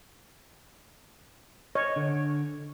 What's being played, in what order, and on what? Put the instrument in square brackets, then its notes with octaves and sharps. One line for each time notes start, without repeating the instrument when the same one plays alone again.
[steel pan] C#5 [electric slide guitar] D#5
[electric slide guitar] D3